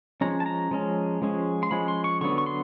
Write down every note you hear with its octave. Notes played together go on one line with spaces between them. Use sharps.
F3 G#3 C#4 A#5
A5
A#5
F3 G#3 C#4
F3 G#3 C#4
C6
F3 G#3 C#4 B5
C6
C#6
D3 F#3 B3 C#6
C#6
C6